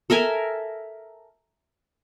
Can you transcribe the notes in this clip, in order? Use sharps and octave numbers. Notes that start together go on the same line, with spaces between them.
A4 A#4 E5 G#5